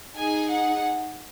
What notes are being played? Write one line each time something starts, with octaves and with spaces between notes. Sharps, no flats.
D#4 G#4 G#5
F#5